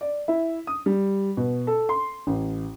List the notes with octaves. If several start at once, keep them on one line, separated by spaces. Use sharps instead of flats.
D5
E4
D#6
G3
B2
A4
C6
A1